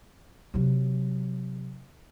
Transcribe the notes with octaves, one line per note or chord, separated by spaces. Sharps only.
C3 F#3